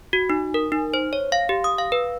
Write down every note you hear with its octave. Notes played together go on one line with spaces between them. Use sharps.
F#4
D#4
A#4
D#4
C5
C#5
F5
G4
D#6
F5
B4